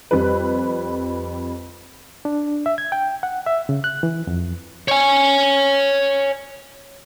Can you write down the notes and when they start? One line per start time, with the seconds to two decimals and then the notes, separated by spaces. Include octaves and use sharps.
0.11 F2 G3 B4
2.25 D4
2.66 E5
2.78 G#6
2.92 G5
3.23 F#5
3.46 E5
3.69 C#3
3.84 F#6
4.03 E3
4.27 F2
4.88 C#5 G#5